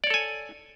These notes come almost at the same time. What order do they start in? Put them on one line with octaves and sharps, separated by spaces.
D5 C#5 A4 G#5